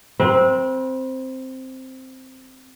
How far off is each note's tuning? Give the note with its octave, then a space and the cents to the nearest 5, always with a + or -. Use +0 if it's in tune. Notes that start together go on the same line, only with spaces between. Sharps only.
C4 +0 B4 -35